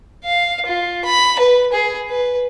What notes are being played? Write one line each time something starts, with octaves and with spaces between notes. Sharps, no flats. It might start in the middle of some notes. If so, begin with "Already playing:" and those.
F5
F4
B5
B4
G#4
B4